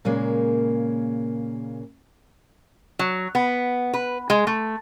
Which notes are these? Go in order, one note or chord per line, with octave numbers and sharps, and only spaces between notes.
A#2 C#3 G#3 A#3
F#3
B3
B4
G#3
A3